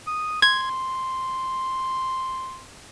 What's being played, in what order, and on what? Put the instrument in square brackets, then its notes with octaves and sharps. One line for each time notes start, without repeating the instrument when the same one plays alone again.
[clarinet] D#6
[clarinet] C6 [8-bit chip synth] G#6